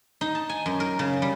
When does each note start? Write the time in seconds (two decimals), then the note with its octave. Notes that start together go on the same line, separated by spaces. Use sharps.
0.21 D#4
0.35 A5
0.49 G#5
0.66 F#2
0.80 A#4
0.99 C#3
1.22 G3